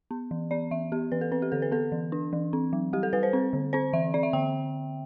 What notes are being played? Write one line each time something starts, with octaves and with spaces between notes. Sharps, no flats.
B3
E3
B3 D5
E3 E5
B3 G4
E3 B4
A4
C4 B4
G4
D3 A4
B4
B3 A4
E3
D4
E3
C4
F#3
G3 G4
A4
G3 B4
C5
C4
D3
C4 C5
E3 E5
C4 D5
E5
D3 G5